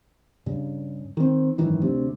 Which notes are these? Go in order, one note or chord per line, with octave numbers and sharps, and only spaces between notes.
G2 C#3
D#3 C4
G#1 F#2 D#3 E3
D2 C3